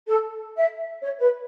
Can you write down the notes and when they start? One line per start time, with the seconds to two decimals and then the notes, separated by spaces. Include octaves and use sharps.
0.07 A4
0.57 E5
1.01 C#5
1.20 B4